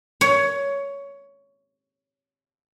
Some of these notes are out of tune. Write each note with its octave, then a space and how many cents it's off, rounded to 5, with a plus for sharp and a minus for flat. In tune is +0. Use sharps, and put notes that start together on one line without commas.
C#5 +15